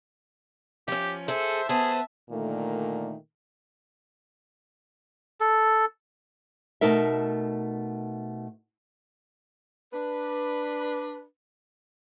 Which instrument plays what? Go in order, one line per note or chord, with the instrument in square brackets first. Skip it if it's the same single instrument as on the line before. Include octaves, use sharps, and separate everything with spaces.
[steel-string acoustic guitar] F3 C#4 [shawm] G4
[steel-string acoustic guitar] G#4 A4 [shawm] C5 [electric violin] E5
[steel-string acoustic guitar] B3 C5 [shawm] G#4 [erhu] A5
[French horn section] A#2 D3 D#3 A3
[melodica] A4
[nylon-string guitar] B2 A3 D#4 A#4 E5
[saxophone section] D4 B4